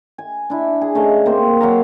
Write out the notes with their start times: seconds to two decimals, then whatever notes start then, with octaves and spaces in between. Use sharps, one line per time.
0.18 G#5
0.50 D4 E4
0.81 G#4
0.95 C#3 A3 D#5 F5
1.26 A#3 C4 C5
1.61 F#3 F5 A#5